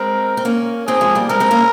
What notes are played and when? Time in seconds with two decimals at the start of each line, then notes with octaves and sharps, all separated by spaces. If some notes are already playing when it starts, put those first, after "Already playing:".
Already playing: G#3 C4 A#4
0.37 C4
0.45 A#3 C#4
0.87 C4 D#4 G#4
1.01 F3 G#3
1.15 G3 A#3
1.29 G#3 C4 A#4
1.40 G#3 C4
1.51 A#3 C#4